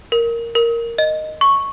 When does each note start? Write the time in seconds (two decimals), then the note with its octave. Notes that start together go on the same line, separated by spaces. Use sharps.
0.12 A#4
0.55 A#4
0.98 D#5
1.41 C#6